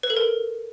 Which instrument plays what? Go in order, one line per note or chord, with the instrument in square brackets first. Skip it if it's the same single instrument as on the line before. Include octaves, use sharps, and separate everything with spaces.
[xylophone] B4
A4
A#4